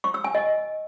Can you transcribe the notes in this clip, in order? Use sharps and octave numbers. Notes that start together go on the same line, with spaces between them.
C#6
E6
G#5
D#5